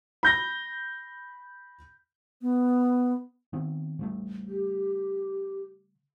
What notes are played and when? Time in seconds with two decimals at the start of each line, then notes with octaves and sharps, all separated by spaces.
0.23 B5 G6 A#6
2.42 B3
3.53 D#3 B3 C4
3.99 C#3 G3 A3
4.48 G4